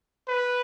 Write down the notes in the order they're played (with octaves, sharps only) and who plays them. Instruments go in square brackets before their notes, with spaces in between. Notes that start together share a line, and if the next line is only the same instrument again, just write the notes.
[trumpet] B4